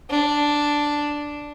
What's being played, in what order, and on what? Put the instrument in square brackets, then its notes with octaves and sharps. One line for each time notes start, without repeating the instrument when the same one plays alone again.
[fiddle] D4